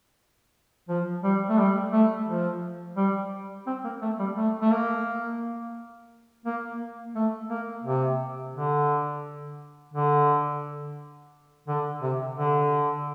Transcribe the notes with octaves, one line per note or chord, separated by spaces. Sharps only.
F3
G3
A3
G3
A3
F3
G3
C4
A#3
A3
G3
A3
A3
A#3
A#3
A3
A#3
C3
D3
D3
D3
C3
D3